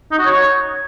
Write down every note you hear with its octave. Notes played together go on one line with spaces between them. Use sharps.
D#4
F#4
C#5